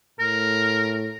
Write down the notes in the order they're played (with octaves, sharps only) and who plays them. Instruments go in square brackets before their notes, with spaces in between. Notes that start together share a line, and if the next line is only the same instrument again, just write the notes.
[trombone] A2 [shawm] A#4